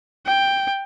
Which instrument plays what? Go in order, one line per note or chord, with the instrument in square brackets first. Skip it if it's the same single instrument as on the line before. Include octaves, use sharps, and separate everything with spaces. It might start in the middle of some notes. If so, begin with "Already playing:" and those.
[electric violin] G5